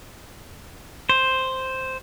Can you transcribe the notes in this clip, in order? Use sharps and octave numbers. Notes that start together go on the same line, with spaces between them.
C5